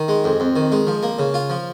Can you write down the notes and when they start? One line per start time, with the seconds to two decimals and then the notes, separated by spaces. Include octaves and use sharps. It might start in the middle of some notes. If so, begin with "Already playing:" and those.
Already playing: D#3
0.08 G#3
0.24 F2
0.40 F2
0.56 D#3
0.72 G#3
0.87 F3
1.03 A#3
1.19 C#3
1.34 F4
1.50 F3